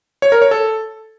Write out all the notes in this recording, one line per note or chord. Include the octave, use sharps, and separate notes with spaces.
C#5
A#4
C#5
A4